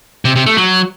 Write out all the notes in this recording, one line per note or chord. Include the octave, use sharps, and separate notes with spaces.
C3
C3
A3
F#3